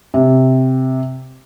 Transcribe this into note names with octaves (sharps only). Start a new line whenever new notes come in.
C3